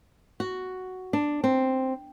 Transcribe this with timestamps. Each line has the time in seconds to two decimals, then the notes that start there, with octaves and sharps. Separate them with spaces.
0.40 F#4
1.13 D4
1.44 C4